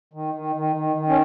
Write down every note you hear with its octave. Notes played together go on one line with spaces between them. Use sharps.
D#3
D#3
D#3
D#3
D#3
C#4